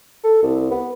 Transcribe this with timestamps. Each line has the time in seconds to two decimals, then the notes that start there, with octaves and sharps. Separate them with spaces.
0.24 A4
0.43 C2
0.71 B3